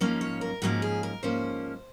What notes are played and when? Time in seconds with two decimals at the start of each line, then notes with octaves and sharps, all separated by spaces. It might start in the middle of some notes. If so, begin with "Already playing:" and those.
0.01 G#2 F3 A#3 C#4
0.21 C#5
0.41 A#4
0.62 G#2 F3 A#3 C#4 F#4
0.82 G#4
1.03 A#4
1.23 G#2 F3 A#3 C#4 C5